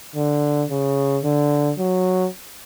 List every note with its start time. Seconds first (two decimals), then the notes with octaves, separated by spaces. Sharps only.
0.16 D3
0.70 C#3
1.24 D3
1.79 F#3